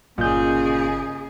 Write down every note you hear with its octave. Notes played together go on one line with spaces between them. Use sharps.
G1 A#2 C#3 G#4 D#5 G#5 D#6 G6